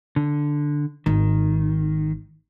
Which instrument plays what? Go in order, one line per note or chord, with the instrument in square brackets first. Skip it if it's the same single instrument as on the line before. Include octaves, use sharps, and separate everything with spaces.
[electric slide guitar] D3
[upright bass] G#1 [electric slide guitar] D#3